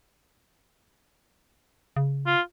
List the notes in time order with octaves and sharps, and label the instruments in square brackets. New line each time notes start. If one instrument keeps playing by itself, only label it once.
[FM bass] C#3
[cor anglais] F4